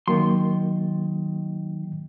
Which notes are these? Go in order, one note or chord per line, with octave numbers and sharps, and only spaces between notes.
D#3 F#3 A#3 C6